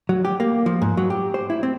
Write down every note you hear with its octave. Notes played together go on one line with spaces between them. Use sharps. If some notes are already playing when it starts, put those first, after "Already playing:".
F#3
G4
A#3
F3
G#2
F#3
G4
C5
E4
C4